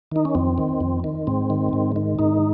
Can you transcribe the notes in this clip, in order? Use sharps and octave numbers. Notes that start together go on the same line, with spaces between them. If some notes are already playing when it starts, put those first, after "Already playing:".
D#3 D#4
C#4
F2 C4
D#3
F2
D#3
G#2 C4
D#3
G#2
D#3
G#2 D#4